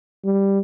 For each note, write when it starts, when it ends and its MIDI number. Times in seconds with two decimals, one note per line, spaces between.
0.25 0.59 55